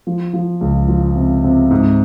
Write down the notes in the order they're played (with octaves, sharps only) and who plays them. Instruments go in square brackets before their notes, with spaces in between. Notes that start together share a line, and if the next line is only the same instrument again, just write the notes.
[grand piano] F3
F3
C#2
F3
C3
C3
G#2